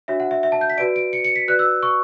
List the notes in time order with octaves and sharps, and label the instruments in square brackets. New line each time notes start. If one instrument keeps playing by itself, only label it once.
[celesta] D4 F#4 C#5 E5
F#5
E5
E5
A5
G6
B6
F#4 B4 D5 D7
D7
C#7
C#7
B6
F#4 B4 D5 F#6
E6
C#6